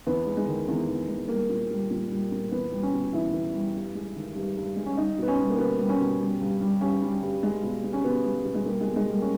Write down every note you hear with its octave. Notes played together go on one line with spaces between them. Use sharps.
E2 B3
G#3
G#3
D#3
E2
E2
G#3
G3 A#3
A#2
G3
A#2
G3
A#2
E2 B3
G3
C#4
B2
E2 E4
E2
G3
G2
G#3
D#3
G2
G2
G#3
C#4
G3 D#4
B2 B3
C#4
G3
A#3
B2 B3
G3
C#4
B2
G3
G2
G3
G2 C#4
G3
G2
G#3
B2
G#3
C#4
B2 B3
G#3
B2
G#3
G3 A#3
G#3
B2
G#3
G3
A#3
C#4